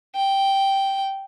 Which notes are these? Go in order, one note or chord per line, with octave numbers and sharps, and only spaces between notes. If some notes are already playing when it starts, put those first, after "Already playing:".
G5